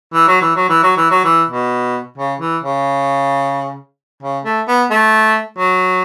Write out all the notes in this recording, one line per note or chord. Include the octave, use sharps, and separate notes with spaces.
E3
F#3
E3
F#3
E3
F#3
E3
F#3
E3
B2
C#3
E3
C#3
C#3
A3
B3
A3
F#3